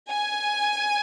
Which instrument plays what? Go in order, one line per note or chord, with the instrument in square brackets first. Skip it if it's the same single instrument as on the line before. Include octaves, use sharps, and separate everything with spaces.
[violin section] G#5